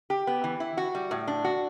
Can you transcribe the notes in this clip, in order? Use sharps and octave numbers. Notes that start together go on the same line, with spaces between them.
G4
B3
E3
E4
F#4
G3
A2
D4
F#4